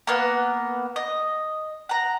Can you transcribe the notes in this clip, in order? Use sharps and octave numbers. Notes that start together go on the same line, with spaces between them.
A#3 B3 F#5
D#5
F#5 A#5